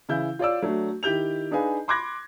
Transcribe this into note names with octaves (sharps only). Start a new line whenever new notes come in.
C#3 E3 E4 G6
F4 C#5 D5 E6
F#3 A3 D4
D#3 E4 G4 G6 F7
D4 D#4 G#4 B4 F5 G#5
B5 C6 D6 F#6 G#6 A#6